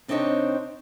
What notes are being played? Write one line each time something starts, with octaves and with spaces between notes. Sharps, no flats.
C3 C4 D4 D#4 C#5 D#5